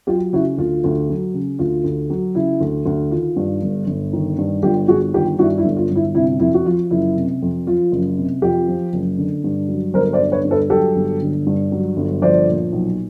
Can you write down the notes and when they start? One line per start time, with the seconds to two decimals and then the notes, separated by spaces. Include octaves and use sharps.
0.07 F#3 F4 G4
0.33 C#3 E4 F#4
0.58 D2 F4
0.84 D2
1.09 F#3
1.34 C#3
1.59 D2 F4
1.84 D2
2.10 F#3
2.35 C#3 E4
2.61 D2
2.86 D2
3.11 D#3 F4
3.36 G2
3.62 G1
3.87 G1
4.13 D#3
4.38 G2
4.63 G1 F4 G4
4.88 G1 F#4 G#4
5.13 D#3 F4 G4
5.39 G2 E4 F#4
5.58 E4
5.64 G1
5.76 F4
5.90 G1
5.95 E4
6.15 C3 E4
6.40 F2 E4
6.54 F#4
6.66 F3 F4
6.91 F#1 E4
7.16 C3
7.42 F2
7.67 F3 F4
7.92 F#1
8.18 C3
8.42 F2 F4 G4
8.68 F3
8.93 F#1
9.18 D3
9.44 G2
9.69 F#3
9.94 G1 A#4 C5
10.13 C5 D5
10.20 D3
10.32 B4 C#5
10.45 G2
10.51 A4 B4
10.70 F#3 G4 A4
10.96 G1
11.22 D3
11.47 G2
11.72 F#3
11.96 G1
12.22 F3 C5 D5
12.48 A#2
12.72 B1